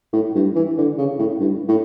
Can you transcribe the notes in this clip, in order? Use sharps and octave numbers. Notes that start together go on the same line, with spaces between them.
A2
G2
E3
D3
C#3
A2
G2
A2